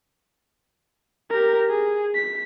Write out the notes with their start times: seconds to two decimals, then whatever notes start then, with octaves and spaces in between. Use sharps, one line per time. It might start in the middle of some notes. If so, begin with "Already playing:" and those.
1.30 G4 A#4
1.70 G#4
2.15 B6